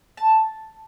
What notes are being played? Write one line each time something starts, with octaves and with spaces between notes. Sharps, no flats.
A5